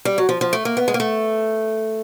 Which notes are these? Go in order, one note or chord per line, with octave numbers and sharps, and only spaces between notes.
G3
F#3
F3
F3
A3
A#3
B3
G#3
A#3
A3